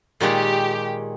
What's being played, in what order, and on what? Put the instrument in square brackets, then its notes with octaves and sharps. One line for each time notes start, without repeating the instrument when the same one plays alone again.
[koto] A#2 D#3 G#3 [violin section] G4